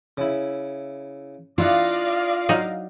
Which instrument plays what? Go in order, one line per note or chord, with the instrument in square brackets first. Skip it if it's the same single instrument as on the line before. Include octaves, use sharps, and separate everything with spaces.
[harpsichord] C#3 E4
[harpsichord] D4 E4 F#5 [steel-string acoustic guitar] F4 [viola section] D5 D#5 F5
[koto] F#3 D#4